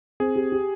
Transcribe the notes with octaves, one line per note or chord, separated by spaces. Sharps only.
C4 G#4
G4
G4